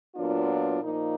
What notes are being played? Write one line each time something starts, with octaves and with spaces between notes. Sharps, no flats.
A#2 F#3 B3 D4 F4
A#2 F3 A#3 D#4